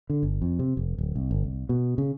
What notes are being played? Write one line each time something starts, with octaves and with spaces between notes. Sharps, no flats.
D3
G1
F2
C3
F1
D1
C2
G1
C2
B2
C#3